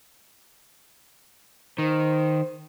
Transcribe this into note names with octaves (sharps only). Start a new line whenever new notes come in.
D#3 C5